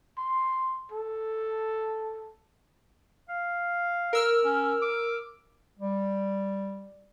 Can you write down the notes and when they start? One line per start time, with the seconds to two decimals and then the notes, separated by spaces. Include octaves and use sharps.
0.18 C6
0.92 A4
3.29 F5
4.13 A#4 E6 F6
4.45 C#4
4.82 D6
5.79 G3